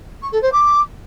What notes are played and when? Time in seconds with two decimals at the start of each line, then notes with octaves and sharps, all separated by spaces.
0.22 C#6
0.32 A4
0.42 C5
0.52 D6